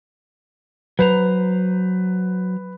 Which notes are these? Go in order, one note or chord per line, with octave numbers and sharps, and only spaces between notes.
F#3 B4 C5 A#5